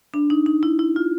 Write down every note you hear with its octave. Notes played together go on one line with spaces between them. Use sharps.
D4
D#4
D#4
E4
E4
F4